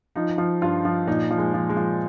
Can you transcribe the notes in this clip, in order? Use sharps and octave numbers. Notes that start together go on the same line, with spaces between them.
F3 D#4
F3
G2 F4
F3
A#2 D#4
F3
G#3
F3
G#3
F3